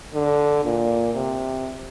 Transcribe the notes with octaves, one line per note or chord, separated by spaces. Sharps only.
D3
A#2
C3